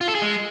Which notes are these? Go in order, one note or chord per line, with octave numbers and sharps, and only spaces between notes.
F4
A4
G#4
G#3